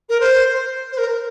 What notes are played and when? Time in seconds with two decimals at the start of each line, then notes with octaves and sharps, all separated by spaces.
0.09 A#4
0.20 C5
0.91 C5
0.97 A#4